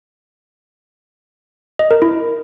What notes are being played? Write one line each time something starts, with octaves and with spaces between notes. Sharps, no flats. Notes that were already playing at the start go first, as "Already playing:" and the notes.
D#5
A#4
E4